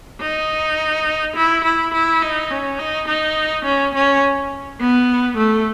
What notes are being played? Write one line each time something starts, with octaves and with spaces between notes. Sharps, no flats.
D#4
E4
E4
E4
D#4
C#4
D#4
D#4
C#4
C#4
B3
A3